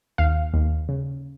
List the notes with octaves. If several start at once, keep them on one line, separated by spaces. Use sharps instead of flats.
D#2 F5
D#2
C#3